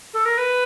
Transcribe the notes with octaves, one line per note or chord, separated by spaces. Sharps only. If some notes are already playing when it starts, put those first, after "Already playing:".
A4
A#4
B4